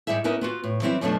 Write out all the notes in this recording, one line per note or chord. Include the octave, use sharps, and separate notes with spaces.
G#2 B2 G3 E4 G#4 E5
B3 C#4 D#4 E4 A#4
B3 F4 F#4
A2
E3 F#3 G3 C4 E4 G4
F#2 B2 F3 F#3 A3 D4